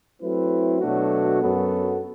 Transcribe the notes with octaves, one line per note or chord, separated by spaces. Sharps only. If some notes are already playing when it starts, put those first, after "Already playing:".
F#3 A3 C4 E4 B4
B2 F#3 A3 D4 F#4
F#2 F#3 B3 F#4 A4